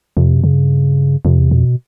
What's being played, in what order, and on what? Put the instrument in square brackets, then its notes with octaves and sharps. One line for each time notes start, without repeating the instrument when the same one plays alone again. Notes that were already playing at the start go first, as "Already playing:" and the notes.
[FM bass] F2 [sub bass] C3
[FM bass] F#2
[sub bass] C#3
[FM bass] G2
[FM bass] F2 [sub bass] C3
[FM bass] E2
[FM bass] F2 [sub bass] B2